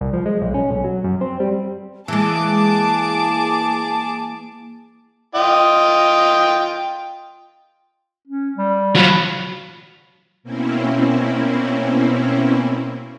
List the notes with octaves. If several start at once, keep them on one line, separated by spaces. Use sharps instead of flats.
C2
F3
G#3
B1
C#4
B1
F#3
F#2
C4
G3
E3 G#3 A#3 G#4 A5 D6
F4 D#5 G5
C#4
G3
F#3 F4 B5
B2 A#3 C4 C#4 E4